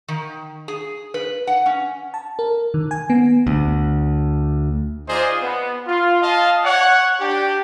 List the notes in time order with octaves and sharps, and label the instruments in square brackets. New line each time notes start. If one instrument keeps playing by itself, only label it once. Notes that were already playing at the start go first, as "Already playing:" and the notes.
[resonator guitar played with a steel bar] D#3
G#4
B4
F#5
C#4
[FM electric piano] A5
A#4
D#3
G#5
B3
[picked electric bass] D2
[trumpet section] D#4 F4 G#4 C5 D5 D#5
B3
F4
D#5 F5 A5
C#5 F#5
D4 G4 G5